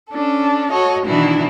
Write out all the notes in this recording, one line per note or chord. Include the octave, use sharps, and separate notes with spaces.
C#4 D4 A4
F#4 A4 C#5 D#5
B2 D#3 E3 D4 E4 F#4